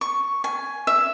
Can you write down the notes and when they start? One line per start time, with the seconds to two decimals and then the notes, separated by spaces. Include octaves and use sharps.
0.01 C#6
0.44 G#5
0.87 E5